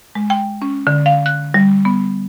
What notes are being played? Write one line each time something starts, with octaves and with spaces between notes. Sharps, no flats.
G#3
G5
C#4
D3
F5
F#6
G3
B3